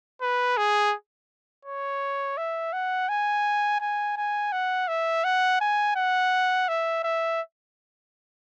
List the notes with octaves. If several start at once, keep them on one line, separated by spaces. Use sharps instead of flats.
B4
G#4
C#5
E5
F#5
G#5
G#5
G#5
F#5
E5
F#5
G#5
F#5
E5
E5